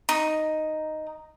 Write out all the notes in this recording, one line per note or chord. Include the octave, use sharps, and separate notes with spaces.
D#4